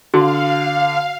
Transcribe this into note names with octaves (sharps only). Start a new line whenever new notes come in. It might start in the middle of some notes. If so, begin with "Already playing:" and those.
D3 F#4 F5